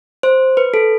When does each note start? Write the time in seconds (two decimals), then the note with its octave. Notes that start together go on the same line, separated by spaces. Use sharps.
0.23 C5
0.57 B4
0.74 A4